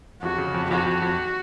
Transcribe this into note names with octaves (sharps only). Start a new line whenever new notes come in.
F2 F#4
C#3
F2
F2 F#4
F2
F2